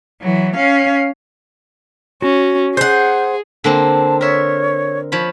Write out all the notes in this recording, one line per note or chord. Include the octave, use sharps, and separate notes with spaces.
E3 F#3
C#4 F5
C#4 F#4
G#4 C5 F#5 G6
D3 A#3 C4 A5
A#4 C#5 E5
F3 C#5 B5